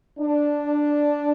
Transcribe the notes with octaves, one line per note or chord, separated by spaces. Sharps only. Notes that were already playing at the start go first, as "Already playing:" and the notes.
D4